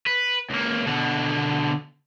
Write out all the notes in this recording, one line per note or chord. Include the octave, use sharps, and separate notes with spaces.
B4
C#2 A#3
B2 D3